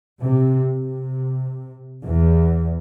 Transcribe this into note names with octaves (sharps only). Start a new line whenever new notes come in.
C3
C3
E2